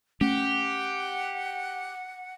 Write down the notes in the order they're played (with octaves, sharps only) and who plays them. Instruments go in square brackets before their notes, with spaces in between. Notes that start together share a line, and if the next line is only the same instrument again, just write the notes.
[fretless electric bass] A3 C#4 [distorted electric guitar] G4 [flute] F#5